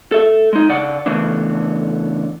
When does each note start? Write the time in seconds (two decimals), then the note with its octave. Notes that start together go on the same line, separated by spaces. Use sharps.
0.12 A4 E5
0.53 G#3 D#4
0.69 C#3 D5 F#5
1.06 C#3 E3 A3 B3 D4